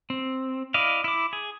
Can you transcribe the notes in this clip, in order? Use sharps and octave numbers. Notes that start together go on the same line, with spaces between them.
C4
E4 D5 D#5 F5
E4 D6
G#4